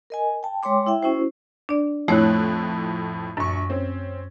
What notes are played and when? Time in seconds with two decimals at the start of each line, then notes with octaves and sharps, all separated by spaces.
0.10 A#4 D#5 G#5
0.43 G5 A5
0.63 G#3 C#5 G5 C6 D6
0.86 E4 E5 G5
1.03 C#4 E4 F#4 C5
1.69 D4 D5
2.08 F2 A2 A3 E4 C#5 F#6
3.37 A#1 F#2 C#6
3.70 C4 C#4